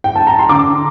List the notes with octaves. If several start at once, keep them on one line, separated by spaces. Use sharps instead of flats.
G5
A5
A#5
C6
D3 A#5 D6